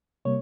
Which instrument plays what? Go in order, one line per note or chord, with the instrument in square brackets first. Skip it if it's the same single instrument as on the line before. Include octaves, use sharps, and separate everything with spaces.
[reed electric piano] C3 G3 A#3 C#5